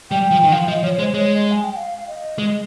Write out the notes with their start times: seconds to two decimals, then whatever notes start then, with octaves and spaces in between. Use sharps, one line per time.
0.11 G3 G5
0.31 F3 G5
0.43 D#3
0.52 F3 F5
0.68 F3 D#5
0.83 F3 C#5
0.98 G#3 C5
1.14 G#3 C#5
1.35 D#5
1.51 G#5
1.64 G5
1.76 F5
2.07 D#5
2.38 G#3 D#5